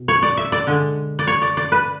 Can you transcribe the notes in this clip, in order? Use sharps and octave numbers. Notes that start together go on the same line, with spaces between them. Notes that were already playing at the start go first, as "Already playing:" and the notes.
Already playing: B2
C#5
D5
E5
D5
D3 G#3
D5
C#5
D5
D5
B4